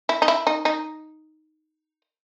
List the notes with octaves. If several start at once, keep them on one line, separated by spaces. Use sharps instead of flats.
E4
D#4
E4
D#4
D#4